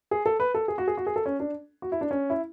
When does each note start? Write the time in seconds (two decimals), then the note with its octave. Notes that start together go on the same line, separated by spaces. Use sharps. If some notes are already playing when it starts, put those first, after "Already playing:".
0.11 G#4
0.26 A4
0.40 B4
0.55 A4
0.68 G#4
0.78 F#4
0.88 G#4
0.97 F#4
1.07 G#4
1.16 A4
1.26 C#4
1.40 D4
1.82 F#4
1.92 E4
2.01 D4
2.11 C#4
2.30 E4